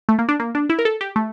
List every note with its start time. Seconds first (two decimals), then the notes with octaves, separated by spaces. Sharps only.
0.09 A3
0.19 A#3
0.29 D4
0.40 A#3
0.55 D4
0.70 E4
0.79 A#4
0.85 A4
1.01 G4
1.16 A3